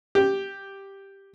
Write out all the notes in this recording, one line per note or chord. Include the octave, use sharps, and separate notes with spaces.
G4